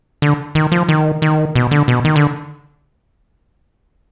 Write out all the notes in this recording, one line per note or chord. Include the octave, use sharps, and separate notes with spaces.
D3
D#3
F3
D#3
D#3
B2
D3
B2
D#3
D3